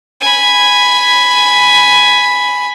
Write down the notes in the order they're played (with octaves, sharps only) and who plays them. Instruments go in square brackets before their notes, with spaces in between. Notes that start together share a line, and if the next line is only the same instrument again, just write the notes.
[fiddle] G#5 B5